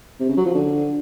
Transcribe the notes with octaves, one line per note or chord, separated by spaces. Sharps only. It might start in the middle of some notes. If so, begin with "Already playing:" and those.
C3
C#3
F#3
F3
D3